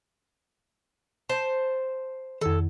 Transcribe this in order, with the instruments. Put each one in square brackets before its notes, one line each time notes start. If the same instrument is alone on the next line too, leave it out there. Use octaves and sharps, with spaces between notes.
[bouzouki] C5 A5
[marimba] F2 D#3 [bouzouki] A4